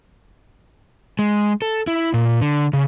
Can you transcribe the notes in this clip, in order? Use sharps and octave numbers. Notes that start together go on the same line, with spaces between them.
G#3
A4
E4
A#2
D3
C#3